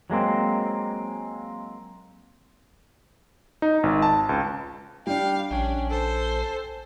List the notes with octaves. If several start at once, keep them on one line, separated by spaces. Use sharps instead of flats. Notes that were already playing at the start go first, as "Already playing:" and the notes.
F#3 G#3 A#3 C4
D#4
G#1
A5
C#2
G3 D4 F5 G5
A#1 C#4 D4 G5 G#5
A4 C5